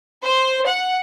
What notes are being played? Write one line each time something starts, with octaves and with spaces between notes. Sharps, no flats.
C5
F#5